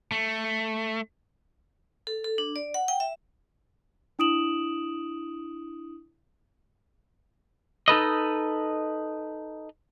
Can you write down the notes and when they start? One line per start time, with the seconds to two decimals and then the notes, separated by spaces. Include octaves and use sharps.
0.12 A3
2.07 A4
2.24 A4
2.38 D4
2.56 D5
2.74 F#5
2.88 G5
3.00 E5
4.19 D4 E4 D#6 D7 E7 F#7
7.88 D#4 A4 B4 D#5